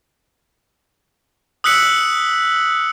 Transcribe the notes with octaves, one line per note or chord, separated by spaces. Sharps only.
D#6 E6 F#6 B6 C#7 F#7